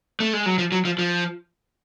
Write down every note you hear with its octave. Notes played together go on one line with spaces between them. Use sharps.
A3
G#3
F#3
F3
F#3
F3
F3